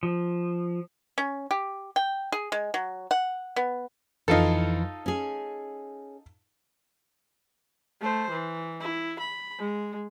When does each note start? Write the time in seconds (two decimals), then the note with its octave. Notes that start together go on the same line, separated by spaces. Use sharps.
0.03 F3
1.18 C#4
1.51 G4
1.96 G5
2.32 G#4
2.52 G#3
2.74 F#3
3.11 F#5
3.56 B3
4.28 F2 E3 D#4 F4 A4
5.06 C#4 G#4
8.01 A3 C5
8.31 E3
8.81 E4
9.20 B5
9.59 G#3